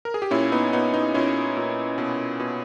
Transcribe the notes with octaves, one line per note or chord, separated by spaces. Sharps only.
A#4
G#4
G4
A#2 C#4 E4
B3 D#4
A#2 B3 D#4
B3 D#4
A#2 C#4 E4
A#2
B2
B2